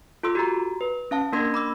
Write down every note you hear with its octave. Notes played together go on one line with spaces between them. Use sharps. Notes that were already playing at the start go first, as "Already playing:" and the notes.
F4 A4 C6 E6
F#4 G4 A#5
B4
C#4 F5 A5
A#3 D4 A#4 C6 G#6 A#6
B5 D6 E6